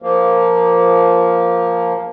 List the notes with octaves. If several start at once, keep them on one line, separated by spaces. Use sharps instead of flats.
F3 A#3